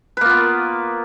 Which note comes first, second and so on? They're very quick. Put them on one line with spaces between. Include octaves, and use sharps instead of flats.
B4 A#3 F4 B3